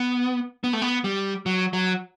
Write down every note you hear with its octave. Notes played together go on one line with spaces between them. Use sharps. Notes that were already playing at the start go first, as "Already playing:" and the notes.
Already playing: B3
B3
A3
B3
G3
F#3
F#3